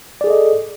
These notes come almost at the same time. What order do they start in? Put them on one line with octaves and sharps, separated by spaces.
D5 G#4 A4 D#5